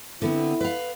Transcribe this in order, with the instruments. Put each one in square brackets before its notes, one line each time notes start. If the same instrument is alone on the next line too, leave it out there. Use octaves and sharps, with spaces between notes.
[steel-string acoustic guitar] D3 B3 C4 [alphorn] E4
[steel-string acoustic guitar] B4 F5